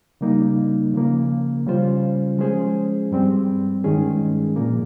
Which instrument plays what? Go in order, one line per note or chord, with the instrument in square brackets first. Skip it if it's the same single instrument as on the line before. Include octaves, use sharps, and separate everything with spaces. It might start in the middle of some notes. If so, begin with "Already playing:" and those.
[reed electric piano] C#3 G3 A#3 D#4
C#3 F3 A#3
C#3 G3 C#4 F4 C5
F3 G#3 C#4 G#4 C5
G2 G3 C4
G2 D#3 G#3 C#4 G#4
A#2 F3 A#3